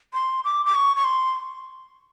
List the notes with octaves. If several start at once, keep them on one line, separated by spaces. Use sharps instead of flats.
C6
D6
D6
C#6
C#6
C6